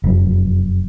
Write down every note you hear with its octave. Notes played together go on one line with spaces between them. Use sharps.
F1 F#2